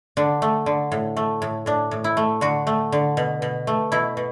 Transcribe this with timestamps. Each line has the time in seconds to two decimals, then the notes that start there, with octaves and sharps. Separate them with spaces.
0.17 D3 D4
0.42 A3
0.66 D3
0.92 A2
1.17 A3
1.42 A2
1.66 A2 D4
1.91 A2
2.04 E4
2.17 A3
2.41 D3 F#4
2.67 A3
2.92 D3
3.17 B2
3.42 B2
3.67 A3
3.92 B2 E4
4.17 B2